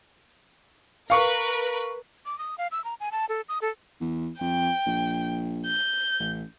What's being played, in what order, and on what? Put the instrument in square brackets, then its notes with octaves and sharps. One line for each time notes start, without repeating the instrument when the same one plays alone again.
[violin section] A#4 B4 [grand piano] F5 C#6
[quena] D6
D#6
F5
E6
A#5
G#5
A5
A4
D#6
A4
[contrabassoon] E2
[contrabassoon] F2 [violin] G5
[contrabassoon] A#1
[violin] G6
[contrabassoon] A1